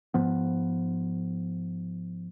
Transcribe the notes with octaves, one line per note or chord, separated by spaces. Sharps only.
G#2 F3 B3